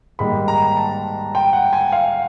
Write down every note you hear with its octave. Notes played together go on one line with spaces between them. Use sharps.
G#2 D#3 G3 A#3 D#4 B5
A#5
A5
G5
F#5
G#5
F5